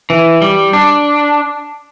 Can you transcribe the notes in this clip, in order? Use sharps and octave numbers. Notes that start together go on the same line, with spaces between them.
E3
G3
D4